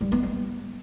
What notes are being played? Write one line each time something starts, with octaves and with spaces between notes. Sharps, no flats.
G3
B3
G3